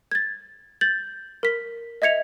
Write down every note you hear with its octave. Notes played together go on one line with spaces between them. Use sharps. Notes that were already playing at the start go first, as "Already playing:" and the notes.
G#6 A6
G6 A6 F#7
A#4 B6
D#5 E5 G#6 C#7 F7